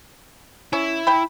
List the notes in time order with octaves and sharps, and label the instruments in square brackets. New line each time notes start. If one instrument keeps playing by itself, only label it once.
[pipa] C#4 [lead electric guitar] E4
[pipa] G5 B5